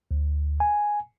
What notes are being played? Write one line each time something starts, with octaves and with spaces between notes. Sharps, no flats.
D2
G#5